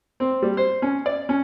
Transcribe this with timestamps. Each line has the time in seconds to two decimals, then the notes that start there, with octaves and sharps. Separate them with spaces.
0.20 C4
0.42 G3
0.57 C5
0.82 C#4
1.06 D5
1.29 C#4